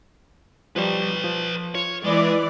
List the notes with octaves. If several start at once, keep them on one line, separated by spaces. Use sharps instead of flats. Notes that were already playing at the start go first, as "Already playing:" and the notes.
F3 G3 B4 C#5
F3
F4 C#5
E3 G#3 D5